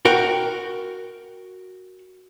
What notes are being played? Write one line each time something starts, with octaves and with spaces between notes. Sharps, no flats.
F#4 A#4 G5